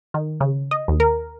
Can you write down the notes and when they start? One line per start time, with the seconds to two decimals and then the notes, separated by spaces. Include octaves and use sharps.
0.14 D#3
0.41 C#3
0.71 D#5
0.88 D#2
1.00 A#4